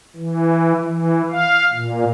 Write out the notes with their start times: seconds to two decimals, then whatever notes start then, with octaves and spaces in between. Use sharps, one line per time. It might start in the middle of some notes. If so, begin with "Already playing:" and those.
0.16 E3
0.85 E3
1.30 F5
1.73 A#2